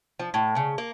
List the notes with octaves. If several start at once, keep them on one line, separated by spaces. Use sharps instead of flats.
F3
A2
C#3
A#3